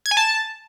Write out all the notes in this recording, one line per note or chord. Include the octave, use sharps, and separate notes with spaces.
G#6
G#5
A5